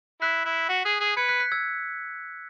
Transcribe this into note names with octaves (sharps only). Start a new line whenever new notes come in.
E4 F#6 B6
E4
F#4
G#4
G#4
B4 G#6 C#7
F#6 B6
F#6 B6
E6 G#6